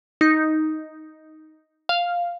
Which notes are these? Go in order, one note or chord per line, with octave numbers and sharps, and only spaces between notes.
D#4
F5